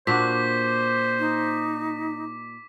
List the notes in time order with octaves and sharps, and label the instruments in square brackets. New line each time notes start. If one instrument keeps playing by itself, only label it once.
[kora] A#2 D4 F#4 [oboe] C5 [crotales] D6 B6
[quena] D#4